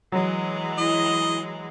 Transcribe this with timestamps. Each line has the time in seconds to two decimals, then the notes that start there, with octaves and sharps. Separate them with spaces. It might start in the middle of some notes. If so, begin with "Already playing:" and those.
0.12 E3 F#3 G#3
0.78 E4 D#5